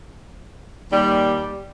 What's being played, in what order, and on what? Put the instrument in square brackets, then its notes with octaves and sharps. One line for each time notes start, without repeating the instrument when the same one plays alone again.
[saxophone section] D#2 G3